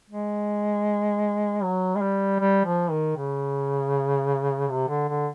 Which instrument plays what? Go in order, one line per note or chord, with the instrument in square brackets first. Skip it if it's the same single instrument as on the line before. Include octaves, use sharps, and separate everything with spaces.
[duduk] G#3
F#3
G#3
G3
G3
F3
D#3
C#3
C3
D3
D3